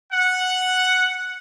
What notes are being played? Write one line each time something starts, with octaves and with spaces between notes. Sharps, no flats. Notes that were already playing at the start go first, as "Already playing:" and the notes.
F#5